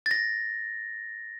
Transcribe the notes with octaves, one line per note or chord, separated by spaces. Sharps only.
A6
A#6